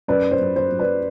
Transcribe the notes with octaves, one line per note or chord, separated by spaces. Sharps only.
F#2 B4 D5
C5
F#2
C5
F#2
B4 D5